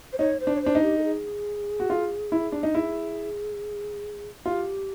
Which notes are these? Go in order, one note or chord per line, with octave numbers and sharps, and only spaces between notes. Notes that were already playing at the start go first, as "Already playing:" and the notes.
C5
D#4 C#5
C5
D4
C#5
D4 C5
D#4
G4
A4
G#4
F#4
F4
E4
D4
D#4
E4 G#4
F4 G4